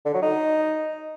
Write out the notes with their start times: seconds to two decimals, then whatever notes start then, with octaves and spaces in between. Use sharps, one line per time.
0.06 D3
0.14 F#3
0.22 D#4